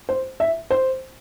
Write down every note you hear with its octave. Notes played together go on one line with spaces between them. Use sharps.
C5
E5
C5